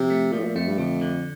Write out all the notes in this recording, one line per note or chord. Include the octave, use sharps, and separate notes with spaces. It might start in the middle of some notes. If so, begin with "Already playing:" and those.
Already playing: C3 F3
A3
A#2 F3
A2
A#2
F2 A3
G2
F2 D3
D3